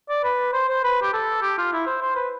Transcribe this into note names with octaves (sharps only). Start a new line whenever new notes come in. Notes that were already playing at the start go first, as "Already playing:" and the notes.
D5
B4
C5
C5
B4
G4
A4
G4
F4
E4
C5
C5
B4